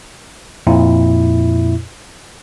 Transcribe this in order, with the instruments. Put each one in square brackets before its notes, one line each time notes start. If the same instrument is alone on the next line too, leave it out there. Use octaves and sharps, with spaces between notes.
[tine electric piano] F2 A#2 E4